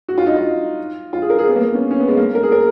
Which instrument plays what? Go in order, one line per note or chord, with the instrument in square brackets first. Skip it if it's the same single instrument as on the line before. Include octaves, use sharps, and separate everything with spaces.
[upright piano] F#4
F4
D#4
F4
F4
G#4
A#4
G#4
B3
A#3
B3
C#4
C#4
B3
G#3
A#3
A#4
G#4
A#4